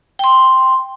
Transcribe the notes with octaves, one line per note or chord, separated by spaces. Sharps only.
G5 C6